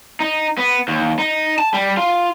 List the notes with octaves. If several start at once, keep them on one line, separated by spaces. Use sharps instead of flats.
D#4
B3
D#2
D#4
A5
G3
F4